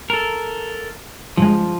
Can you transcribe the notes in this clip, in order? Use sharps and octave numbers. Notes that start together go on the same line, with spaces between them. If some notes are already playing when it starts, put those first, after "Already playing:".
A4 A#4
G2 C#3 F3 G#3